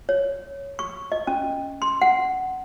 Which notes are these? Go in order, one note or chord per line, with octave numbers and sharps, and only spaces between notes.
C#5
C#6
D#5
C#4
C6
F#5